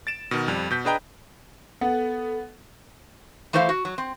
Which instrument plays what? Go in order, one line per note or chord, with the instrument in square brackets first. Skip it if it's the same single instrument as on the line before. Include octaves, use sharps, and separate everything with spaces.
[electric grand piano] A6 D7 E7
B2 D#3
F2 G3
B2 G6 B6
D4 G#4 B4 D#5 G5 A#5
[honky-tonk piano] B3 [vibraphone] A4 [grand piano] F#5
[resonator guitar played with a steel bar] E3 A3 E4 C5 E5 F5
F#4
F#3
C4